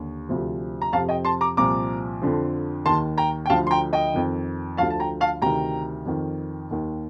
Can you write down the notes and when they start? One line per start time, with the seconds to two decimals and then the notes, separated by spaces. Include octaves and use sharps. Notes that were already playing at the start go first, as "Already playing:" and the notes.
Already playing: D#2 D3
0.29 D2 C3 F3
0.82 A#5
0.93 F2 C3 F3 F5 A5
1.09 D#5 G5
1.25 A5 C6
1.41 A#5 D6
1.57 C2 A#2 F3 A#5 D6
2.22 F2 D3 F3
2.86 D#2 D#3 A5 C6
3.18 G5 A#5
3.46 G5
3.50 D2 D3 F3 F5 A5
3.67 C6
3.71 G5 A#5
3.93 D#5 G5
4.14 F2 D#3
4.77 D2 D3 F3 F5 A5
4.90 A5
5.00 G5 A#5
5.21 F5 A5
5.42 D2 C3 D#3 G5 A#5
6.06 F2 D#3
6.71 D#2 D#3